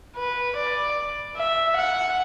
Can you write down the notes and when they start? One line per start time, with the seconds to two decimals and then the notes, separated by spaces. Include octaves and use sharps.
0.16 B4
0.56 D5
1.36 E5
1.76 F#5